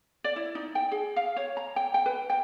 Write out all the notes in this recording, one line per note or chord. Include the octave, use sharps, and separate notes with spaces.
D5
E4
D#4
G5
G#4
F5
C#5
A#5
G5
G5
B4
G5